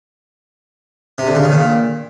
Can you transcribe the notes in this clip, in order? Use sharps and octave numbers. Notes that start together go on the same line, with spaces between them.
C3
D3
C#3
D#3
A#2